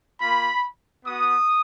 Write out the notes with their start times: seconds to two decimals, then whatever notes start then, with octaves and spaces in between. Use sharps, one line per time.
0.20 A#3 F4 B5
1.06 B3 F#4 D#6